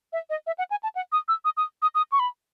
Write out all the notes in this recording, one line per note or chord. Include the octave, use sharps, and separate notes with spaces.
E5
D#5
E5
F#5
G#5
A5
F#5
D#6
E6
D#6
D#6
D#6
D#6
C#6
B5